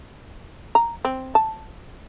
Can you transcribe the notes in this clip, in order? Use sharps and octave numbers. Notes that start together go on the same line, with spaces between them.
A#5
C4
A5